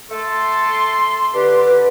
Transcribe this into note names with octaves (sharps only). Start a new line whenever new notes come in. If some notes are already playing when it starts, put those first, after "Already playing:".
A3 A4 C6
D3 G4 B4